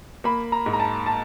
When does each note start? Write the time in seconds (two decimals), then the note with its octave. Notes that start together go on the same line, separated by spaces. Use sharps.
0.24 A#3 B5
0.52 A#5
0.66 G#2
0.73 A#5
0.80 A5
1.06 A5